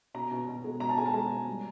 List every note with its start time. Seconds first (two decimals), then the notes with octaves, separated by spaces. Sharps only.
0.14 B2 A#5
0.31 B2
0.48 B2
0.64 G#3
0.80 B2 A#5
0.89 A5
0.97 G#3 G#5
1.06 A5
1.14 G#3 A#5
1.30 B2
1.47 G3